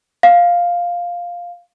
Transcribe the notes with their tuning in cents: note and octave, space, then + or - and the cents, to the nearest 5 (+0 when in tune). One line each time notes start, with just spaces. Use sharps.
F5 +5